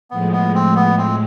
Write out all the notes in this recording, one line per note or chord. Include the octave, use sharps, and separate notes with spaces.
A2 F3 G#3 B3
B3
C4
B3
C4